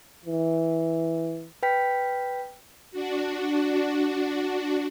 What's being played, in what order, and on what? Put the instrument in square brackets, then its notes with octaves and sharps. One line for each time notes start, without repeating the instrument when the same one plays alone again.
[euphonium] E3
[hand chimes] B4 G5 B6
[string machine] D4 F#4